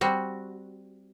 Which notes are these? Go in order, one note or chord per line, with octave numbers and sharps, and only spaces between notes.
G3 C4 F#4